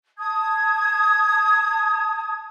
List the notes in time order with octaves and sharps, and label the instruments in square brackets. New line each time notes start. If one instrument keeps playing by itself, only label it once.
[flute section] A5 D#6 G#6